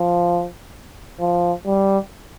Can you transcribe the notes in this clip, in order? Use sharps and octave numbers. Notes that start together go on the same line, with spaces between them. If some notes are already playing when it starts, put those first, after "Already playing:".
Already playing: F3
F3
G3